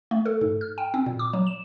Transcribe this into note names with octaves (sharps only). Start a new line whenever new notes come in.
A3
A4
G#2
F6
G5
C4
A#2
D6
F#3
E7